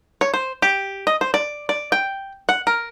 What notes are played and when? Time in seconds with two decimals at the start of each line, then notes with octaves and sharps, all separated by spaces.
0.21 C#5
0.34 C5
0.62 G4
1.07 D#5
1.21 C5
1.34 D5
1.69 D5
1.92 G5
2.49 F#5
2.67 A#4